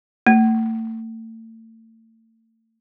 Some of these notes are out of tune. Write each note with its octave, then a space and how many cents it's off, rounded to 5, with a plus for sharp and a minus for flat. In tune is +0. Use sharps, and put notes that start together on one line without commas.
A3 +35